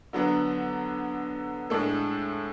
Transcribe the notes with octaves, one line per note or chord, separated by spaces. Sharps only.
D3 F#3 B3 D4
A2 G#3 D4 A4